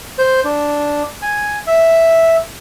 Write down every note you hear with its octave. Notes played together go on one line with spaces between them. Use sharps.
C5
D4
G#5
E5